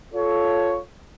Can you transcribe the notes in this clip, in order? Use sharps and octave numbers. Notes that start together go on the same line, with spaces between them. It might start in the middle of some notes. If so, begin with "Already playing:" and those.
F4 A4 C#5